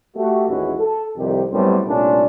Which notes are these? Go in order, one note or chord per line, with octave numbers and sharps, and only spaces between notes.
A3 F#4 G4
A1 D#2 G#3 C#4 E4 F#4
A4
C2 F2 D#3 G4
F#2 A2 G3 B3 C4 C5
C2 A#2 A3 C#4 D4